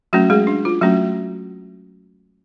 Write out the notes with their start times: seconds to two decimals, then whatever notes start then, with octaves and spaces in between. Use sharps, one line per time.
0.13 F#3 A3 C#4 F#4
0.30 G#3 G#4
0.47 D4
0.65 F4
0.81 F#3 A3 C#4 F#4